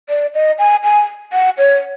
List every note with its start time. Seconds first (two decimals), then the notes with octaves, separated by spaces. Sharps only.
0.09 D5
0.34 D#5
0.59 G#5
0.84 G#5
1.33 F#5
1.58 C#5